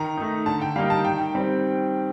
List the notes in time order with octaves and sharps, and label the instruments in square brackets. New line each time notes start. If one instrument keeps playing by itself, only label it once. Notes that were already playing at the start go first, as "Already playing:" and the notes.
Already playing: [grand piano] D#3 A#5
A3 D#4
D3 A5
G5
G3 A#3 D#4 F5
A5
D#3 G5
G3 C4